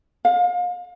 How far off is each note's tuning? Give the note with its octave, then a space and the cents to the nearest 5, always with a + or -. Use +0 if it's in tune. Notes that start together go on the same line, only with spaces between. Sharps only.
F5 +35